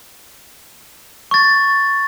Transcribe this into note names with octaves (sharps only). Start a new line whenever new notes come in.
C#6 A6